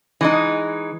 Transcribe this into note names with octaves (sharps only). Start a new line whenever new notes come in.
E3 G#3 D#4